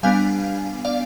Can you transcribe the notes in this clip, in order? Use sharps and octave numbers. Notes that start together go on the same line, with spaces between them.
G3 B3 D4 F5 G#5
D5 F5